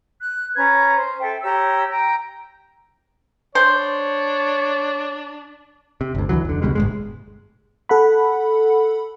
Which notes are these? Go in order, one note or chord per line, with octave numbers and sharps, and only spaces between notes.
F#6
C#4 B4 A#5 G#6
C5
A4 E5 G5
G4 C#5 A#5 E6
G5 A#5
D4 C5 C#5
C3
G1 D2
D2 C3 E3 F#3
F1 D3
C#2 B2 G3 G#3
G1 A2 G#3
A4 F#5 B5